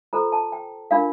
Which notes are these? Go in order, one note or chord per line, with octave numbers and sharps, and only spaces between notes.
F4 A4 C5 A#5
A5
G5
D4 F4 A#4 F5